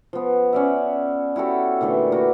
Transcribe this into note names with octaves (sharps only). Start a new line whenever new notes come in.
F3 B3
C#4 D5 E5
E4 F#4 G4 A4
A#2 D3 E3 A3
E3 A#3 E4 F#4